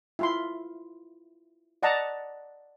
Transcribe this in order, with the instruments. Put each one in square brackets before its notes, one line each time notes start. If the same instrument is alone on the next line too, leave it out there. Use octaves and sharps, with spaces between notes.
[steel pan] E4 F4 C6
D5 D#5 F#5 A5 A#5